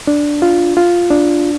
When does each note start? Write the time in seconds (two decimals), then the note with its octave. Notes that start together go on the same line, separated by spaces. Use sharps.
0.07 D4
0.42 F4
0.77 F4
1.10 D4